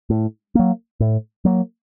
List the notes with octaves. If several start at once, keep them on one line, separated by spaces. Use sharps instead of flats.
A2
F#3 A#3
A2
F#3 A#3